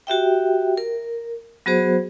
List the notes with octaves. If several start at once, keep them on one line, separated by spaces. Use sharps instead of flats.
F#4 G4 E5 G5
A#4
F#3 B3 F#4 G#4 C5